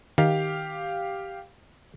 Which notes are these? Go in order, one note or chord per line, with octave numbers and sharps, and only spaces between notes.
D#3 G4 F5